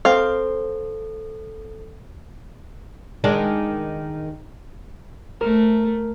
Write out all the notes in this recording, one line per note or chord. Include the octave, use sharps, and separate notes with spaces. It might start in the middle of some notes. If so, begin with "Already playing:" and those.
C4 A4 F5
D#3 G#3 D4
A3 A#4